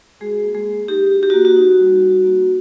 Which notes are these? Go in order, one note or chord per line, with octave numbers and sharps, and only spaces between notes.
G#3 F#4 G#4
A#3
G#3 G#4
A#3
D#4 G4
F#4
G4
F#4
A#3
F#4
D#4
G3
G3
A#3